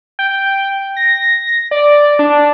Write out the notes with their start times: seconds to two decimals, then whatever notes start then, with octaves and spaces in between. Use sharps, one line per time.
0.19 G5
0.96 A#6
1.71 D5
2.19 D4